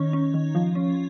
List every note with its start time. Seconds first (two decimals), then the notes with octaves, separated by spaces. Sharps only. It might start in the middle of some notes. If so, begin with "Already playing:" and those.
Already playing: D#3 C#4
0.13 C#4
0.34 D#3
0.55 F3
0.75 C#4